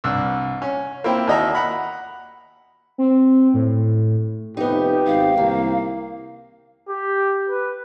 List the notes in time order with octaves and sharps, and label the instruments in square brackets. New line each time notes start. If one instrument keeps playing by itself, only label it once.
[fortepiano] C2 G2 E6
C#4
A#3 C4 E4 G5
D#2 A#3 F#4 D#5 E5 A#5
F#5 A#5 B5
[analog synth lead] C4
A2
[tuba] F1 [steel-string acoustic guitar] B3 D#4 [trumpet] G4
[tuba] G#1 [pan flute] F5
[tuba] C2 [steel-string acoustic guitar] D#3 [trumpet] A#3
[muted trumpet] G4
B4